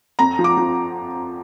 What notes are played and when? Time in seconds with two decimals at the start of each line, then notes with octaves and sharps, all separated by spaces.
0.19 F2 A#5
0.39 F3
0.44 D6
0.57 F3